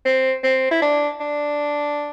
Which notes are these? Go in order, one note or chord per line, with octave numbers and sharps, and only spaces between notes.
C4
C4
E4
D4
D4